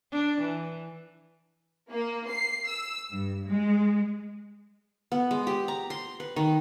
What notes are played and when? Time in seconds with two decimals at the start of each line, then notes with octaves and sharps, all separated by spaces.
0.12 D4
0.40 E3
1.90 A#3
2.28 C7
2.67 E6
3.11 G2
3.47 G#3
5.12 B3
5.31 G#3
5.47 G4
5.68 A#5
5.90 C6
6.20 B4
6.36 D#3